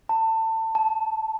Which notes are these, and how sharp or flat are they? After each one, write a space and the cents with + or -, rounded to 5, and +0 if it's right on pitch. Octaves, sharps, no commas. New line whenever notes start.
A5 +25
A5 -10